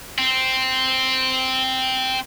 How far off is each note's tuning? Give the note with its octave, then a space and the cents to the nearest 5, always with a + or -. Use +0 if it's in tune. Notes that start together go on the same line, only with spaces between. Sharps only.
C4 -5